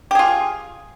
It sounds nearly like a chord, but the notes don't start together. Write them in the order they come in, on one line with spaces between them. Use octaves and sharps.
G4 G#4 F4